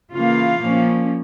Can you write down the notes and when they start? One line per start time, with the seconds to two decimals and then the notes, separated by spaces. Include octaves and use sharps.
0.14 C#3 E3 A#3 F4 F5
0.60 A#2 F3 A#3 C#4